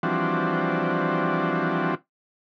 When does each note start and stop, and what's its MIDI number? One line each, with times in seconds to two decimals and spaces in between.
0.03 1.95 52
0.03 1.95 53
0.03 1.95 55
0.03 1.95 60
0.03 1.95 62
0.03 1.95 66